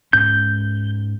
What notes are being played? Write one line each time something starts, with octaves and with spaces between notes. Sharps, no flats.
G#2 C#4 G6